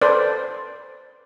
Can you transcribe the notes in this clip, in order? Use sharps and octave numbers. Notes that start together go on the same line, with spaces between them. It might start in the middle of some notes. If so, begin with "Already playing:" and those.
A4 B4 C5 D5